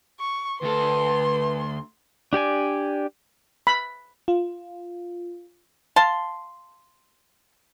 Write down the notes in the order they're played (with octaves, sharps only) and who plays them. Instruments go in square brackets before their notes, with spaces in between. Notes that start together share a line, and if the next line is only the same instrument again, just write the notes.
[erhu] C#6
[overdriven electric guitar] D2 A4 [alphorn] B4 [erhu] C6
[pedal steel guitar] D4 G4 D5 G#5
[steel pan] B5
[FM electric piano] F4
[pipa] F5 A5 C6